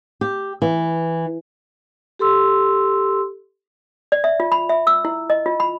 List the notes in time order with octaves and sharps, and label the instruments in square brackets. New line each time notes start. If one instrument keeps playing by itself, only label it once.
[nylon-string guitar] G4
E3
[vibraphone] G4 A4 C6 E6
[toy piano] D5
E5
F4
B5
E5
E6
E4
D#5
F4
B5